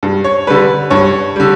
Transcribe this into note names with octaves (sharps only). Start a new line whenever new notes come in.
G2
C#5
D3 G3 B4
G2 C#5
D3 G3